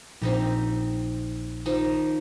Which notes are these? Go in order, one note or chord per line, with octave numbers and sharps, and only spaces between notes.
A#1 C4 D#4 G4
D#3 F3 D#4